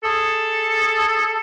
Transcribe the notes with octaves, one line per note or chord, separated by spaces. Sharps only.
G#4 A4